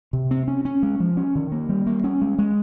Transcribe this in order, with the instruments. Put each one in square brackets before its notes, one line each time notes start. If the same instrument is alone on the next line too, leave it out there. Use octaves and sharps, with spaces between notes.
[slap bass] C3
C4
C#4
C#4
G#3
F3
C#4
D#3
A#3
G3
A#3
C#4
G#3
G#3